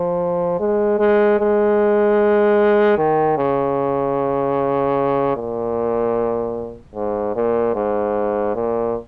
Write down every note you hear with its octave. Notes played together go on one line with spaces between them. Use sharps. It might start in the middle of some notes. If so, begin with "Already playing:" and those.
Already playing: F3
G#3
G#3
G#3
D#3
C#3
A#2
G#2
A#2
G#2
A#2